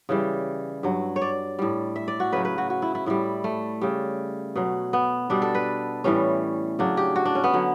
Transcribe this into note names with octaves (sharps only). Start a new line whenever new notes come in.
C#3 E3 G3
G2 F#3
C#5
D5
A2 G3
E5
D5
F#4
C#3 F#3 B4
B4
F#4
F#4
E4
E4
A2 G3 E4
A3
C#3 G3
B2 F#3
B3
B2 G3 D4
A4
B4
A2 E3 G3 C#4
C#3 F#3 D4
G4
F#4
D4
C#4
B3
D3 F#3